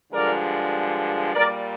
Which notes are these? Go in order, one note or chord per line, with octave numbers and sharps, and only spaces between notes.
G2 D3 F3 G#3 A#4 D5
A#2 G3 A#4 D5